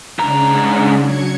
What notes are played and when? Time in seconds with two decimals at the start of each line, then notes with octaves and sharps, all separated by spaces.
0.19 G#2 C#3 D4 A#5
1.03 F#3 G#6 C#7